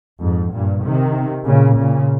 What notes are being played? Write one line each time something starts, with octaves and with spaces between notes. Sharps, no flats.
F2 G#2
G2 A#2
C3 D#3
A#2 C#3
A#2 C#3